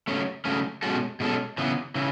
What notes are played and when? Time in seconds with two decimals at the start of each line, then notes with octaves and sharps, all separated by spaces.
0.07 C#3 F#3 A3 C#4
0.45 C#3 F#3 A3 C#4
0.82 B2 G#3 C#4 F#4 A4
1.20 B2 G#3 C#4 F#4 A4
1.58 C#3 E3 B3
1.95 C#3 E3